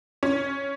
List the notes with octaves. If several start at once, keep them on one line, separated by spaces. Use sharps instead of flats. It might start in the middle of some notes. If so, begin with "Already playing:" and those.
C#4